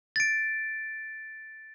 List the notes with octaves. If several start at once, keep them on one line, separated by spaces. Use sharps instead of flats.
A6 D7